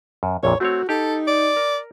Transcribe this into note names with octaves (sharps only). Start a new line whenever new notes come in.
F#2
A#1 F2 A#2 C#5
A3 C4 F#4 C#5
D#4 G4 A4
D5
A#4